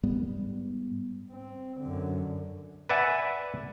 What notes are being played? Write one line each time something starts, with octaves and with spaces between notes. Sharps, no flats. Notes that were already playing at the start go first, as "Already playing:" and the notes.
G#2 G3 B3
C4
F#2 D3
B4 D5 E5 F#5 G#5